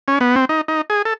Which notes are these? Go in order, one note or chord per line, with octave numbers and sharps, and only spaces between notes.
C#4
B3
C4
D#4
D#4
G#4
A4